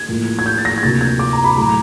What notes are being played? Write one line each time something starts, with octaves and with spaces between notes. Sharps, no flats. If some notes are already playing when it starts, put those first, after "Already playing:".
Already playing: G#6
A2 F3 A#3
G#6
G6
A6
A#6
G#6
D2 C3 F3 A#3 A6
G#6
D6
A#5
B5
A2 F#3 A3 A#5